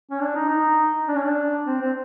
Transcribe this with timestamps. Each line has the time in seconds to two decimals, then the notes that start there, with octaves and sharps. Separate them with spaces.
0.11 C#4
0.21 D4
0.35 D#4
0.49 D#4
1.08 D4
1.15 C#4
1.23 D4
1.67 C4
1.82 C4